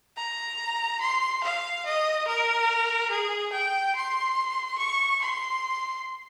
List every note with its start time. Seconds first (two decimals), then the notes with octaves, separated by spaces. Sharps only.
0.17 A#5
1.01 C6
1.43 F5
1.85 D#5
2.27 A#4
3.10 G#4
3.53 G5
3.95 C6
4.78 C#6
5.21 C6